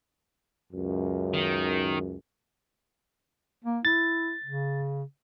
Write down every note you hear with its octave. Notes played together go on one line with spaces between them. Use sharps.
C#2 F#2
D#3
A#3
E4 A6
C#3